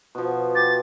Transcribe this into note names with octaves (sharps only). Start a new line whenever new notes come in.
B2 F3
G4 A6